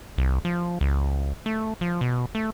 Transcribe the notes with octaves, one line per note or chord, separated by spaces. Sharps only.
C2
F3
C#2
A3
F3
B2
A3